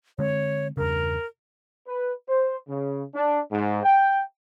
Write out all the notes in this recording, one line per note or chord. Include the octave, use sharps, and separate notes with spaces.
D3 G#3 C4 C#5
E2 G2 C#3 A#4
B4
C5
C#3
D4
G#2
G5